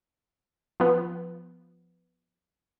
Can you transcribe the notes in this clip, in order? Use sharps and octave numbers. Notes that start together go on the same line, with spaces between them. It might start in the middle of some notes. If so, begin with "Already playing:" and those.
F3 B3